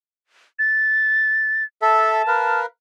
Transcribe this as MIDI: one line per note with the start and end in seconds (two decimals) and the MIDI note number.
0.59 1.64 93
1.82 2.22 69
1.82 2.22 76
1.82 2.60 81
2.27 2.66 70
2.27 2.66 71
2.27 2.66 77